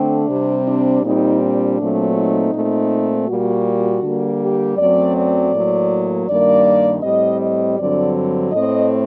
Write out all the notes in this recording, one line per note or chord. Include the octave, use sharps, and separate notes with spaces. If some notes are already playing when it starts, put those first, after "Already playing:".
Already playing: D3 A3 C4 D4
C3 G3 C4
D4
A#2 G3 C4 D#4
D4
A#2 F#3 A3 C4
D#4
A#2 A3 C4
A#2 G3 A#3 F#4
D3 G3 A#3
G4
F#2 F#3 A3 C4 D5
D5
A2 F#3 A#3
G2 D#3 G3 A#3 D5
A2 G3 C4 D#5
D#5
G2 D3 F#3 C4 D5
A2 A3 C4 D#5